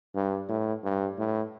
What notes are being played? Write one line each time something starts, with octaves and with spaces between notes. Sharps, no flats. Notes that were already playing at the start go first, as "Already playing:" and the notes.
G2
A2
G2
A2